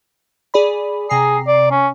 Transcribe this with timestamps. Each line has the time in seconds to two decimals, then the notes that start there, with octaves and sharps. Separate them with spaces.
0.54 G#4 D5 B5
1.09 C3 G#4 A#5 C7
1.47 D5
1.71 C#4